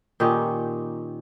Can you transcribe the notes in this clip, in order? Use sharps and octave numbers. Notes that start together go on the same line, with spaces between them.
A#2 D#3 C#4 G4